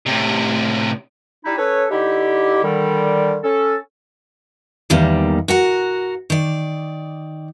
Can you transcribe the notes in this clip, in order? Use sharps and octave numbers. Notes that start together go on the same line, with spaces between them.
A2 C3
G3 D#4 E4
C#4 A4 B4 C#5
D3 D#4 E4 G4
D3 D#3 G3
C#4 A4
E2 G#2 D#3 G3 A#3
F#4 A#4 F#5
D#3 D5